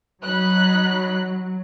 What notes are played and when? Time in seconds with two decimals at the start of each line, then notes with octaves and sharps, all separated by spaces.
0.23 F#3 D#4 B5 F#6